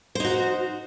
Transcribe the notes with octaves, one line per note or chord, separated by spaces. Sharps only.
D#4 F#4 C5